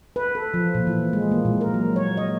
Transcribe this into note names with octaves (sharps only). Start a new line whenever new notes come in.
B4
A4
F3
A#2
E3
G#3
A#3
A#2
A#4
F#3
C#5
D#5